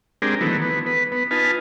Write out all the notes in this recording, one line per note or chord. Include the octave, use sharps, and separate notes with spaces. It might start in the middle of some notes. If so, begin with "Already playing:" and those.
G#3 C4 D4 G4 G#4 A#4
D#3 E3 F#3 A3 B3
B3
B4
B3
D#4 F4 B4 G#5 A5